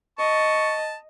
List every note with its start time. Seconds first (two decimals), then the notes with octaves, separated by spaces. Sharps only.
0.19 D#5 A5 C#6